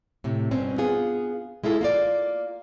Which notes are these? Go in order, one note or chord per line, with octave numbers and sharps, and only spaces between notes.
A2 C3
G2 B2 C4 C#4
B3 F4 G#4
G#3 E4 F4 A4
A#3 F4 D5